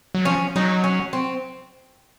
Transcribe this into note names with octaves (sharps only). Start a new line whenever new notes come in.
F#3
F3 C#4
F#3 D#4
C#4
C4